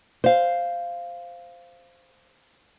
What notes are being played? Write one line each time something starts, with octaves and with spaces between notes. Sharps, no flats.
C5 F5